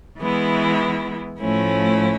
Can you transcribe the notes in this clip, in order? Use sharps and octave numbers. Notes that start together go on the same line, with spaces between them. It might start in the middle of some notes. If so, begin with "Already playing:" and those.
E3 G#3 B3 E4
A2 F3 A3 C#4 E4